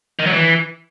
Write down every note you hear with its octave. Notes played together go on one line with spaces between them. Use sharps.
D#3
F#3
E3